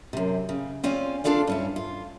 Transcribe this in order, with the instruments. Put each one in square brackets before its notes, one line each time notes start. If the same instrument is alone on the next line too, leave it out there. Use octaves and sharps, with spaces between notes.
[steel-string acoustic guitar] F#2 C3
C#3
C4 C#4 F4 D5 G#5
D4 F4 A4 D5 F5
G2 C#4 E4
F4